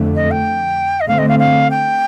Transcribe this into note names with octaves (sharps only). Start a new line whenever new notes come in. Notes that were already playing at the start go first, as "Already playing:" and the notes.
Already playing: F2 D3 A3
D#5
G5
D#5
D3 A3 C4 F5
D#5
F5
F5
G5